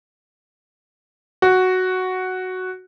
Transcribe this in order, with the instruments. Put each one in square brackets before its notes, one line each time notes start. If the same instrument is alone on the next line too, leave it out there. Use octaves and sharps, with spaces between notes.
[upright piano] F#4